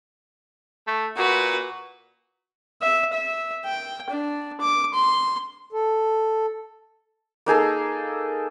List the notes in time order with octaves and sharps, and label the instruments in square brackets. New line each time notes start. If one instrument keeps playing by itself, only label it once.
[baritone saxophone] A3
[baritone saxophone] A#2 [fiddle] F#4 B4
[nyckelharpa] E5
E5
G5
D4
D6
C6
[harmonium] A4
[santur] A#3 D#4 G#4 A4